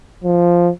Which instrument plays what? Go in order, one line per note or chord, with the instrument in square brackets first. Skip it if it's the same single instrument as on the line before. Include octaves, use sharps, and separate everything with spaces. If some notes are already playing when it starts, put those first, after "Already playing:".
[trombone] F3